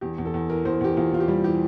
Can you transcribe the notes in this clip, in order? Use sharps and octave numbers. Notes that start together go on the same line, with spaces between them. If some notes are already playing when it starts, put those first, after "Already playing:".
E2 G4
E2
A4
E2
E3 A#4
E2 C5
A#4
E2 G4
E2 F4
E2 F4
G4
G3
E3 G4